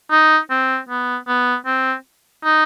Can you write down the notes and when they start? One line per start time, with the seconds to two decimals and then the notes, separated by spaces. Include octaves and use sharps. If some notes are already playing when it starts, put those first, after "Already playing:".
0.11 D#4
0.50 C4
0.89 B3
1.28 B3
1.66 C4
2.44 D#4